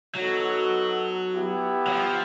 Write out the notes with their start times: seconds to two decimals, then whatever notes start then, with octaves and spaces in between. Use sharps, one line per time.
0.15 F#3 B3 D#4 F#4 A4
1.32 B3 E4 G4
1.87 F#3
1.92 F3